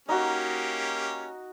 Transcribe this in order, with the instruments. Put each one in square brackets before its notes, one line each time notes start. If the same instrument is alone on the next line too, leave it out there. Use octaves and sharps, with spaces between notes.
[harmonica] A#3 C#4 G4 [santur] D#4 F#4